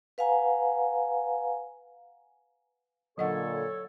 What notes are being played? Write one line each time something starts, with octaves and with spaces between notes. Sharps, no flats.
B4 F5 F#5 G#5 A#5
A#2 D3 F#3 A4 C#5 D#5 F#5